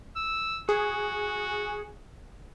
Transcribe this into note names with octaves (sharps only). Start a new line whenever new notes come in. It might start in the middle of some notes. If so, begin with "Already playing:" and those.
E6
F#4 G#4